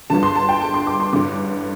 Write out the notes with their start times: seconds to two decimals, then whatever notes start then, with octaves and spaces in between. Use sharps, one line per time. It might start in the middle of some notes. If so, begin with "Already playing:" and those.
0.10 G1 G2 D3 A5
0.23 C6
0.36 A5
0.49 G5
0.61 A5
0.74 C6
0.87 D6
1.00 C6
1.13 A1 G2 D3 D6